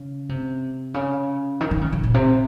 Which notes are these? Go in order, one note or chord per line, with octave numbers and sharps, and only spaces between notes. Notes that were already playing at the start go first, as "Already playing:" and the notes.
Already playing: C#3
C3
C#3
D#3
D#3
C#3
C#3
A#2
C3